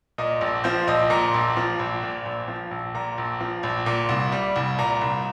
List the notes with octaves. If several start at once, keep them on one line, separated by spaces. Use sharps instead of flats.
A#2 D#5
A#1
F3 C5
A#1 D#5
A#2 A#5
A#1
F3
A#1
A#2
A#1
F3
A#1
A#2 A#5
A#1
F3
A#1
A#2
C2
G3
C2
A#2 A#5
C2